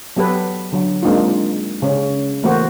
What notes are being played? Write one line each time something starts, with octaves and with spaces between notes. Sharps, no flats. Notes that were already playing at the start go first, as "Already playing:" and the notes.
F#3 B3 G4 A4 B4
D3 F#3
G#3 A#3 C4 D4 D#4 F4
C#3 C#4
E3 A3 A#3 C4 F#4 C5